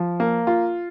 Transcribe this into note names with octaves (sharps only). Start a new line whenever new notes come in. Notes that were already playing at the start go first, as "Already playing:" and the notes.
Already playing: F3
A#3
F4